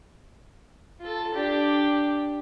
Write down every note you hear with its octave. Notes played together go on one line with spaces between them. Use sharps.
F4 A4
D4 G4